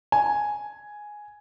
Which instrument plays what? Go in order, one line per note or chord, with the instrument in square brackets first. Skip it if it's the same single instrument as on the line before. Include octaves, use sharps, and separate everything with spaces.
[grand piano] G#5